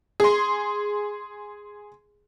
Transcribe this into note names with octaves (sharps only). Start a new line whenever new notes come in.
G#4 C6